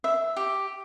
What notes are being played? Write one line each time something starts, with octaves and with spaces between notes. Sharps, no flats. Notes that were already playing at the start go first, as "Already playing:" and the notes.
E5
G4